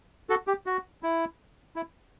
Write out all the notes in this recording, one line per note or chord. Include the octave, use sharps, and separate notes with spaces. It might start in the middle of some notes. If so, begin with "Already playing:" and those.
F#4 A4
G4
F#4
E4
E4